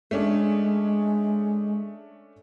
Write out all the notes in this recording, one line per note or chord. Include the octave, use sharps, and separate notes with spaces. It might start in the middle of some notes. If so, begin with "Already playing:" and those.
G#3 A3 C#4 D4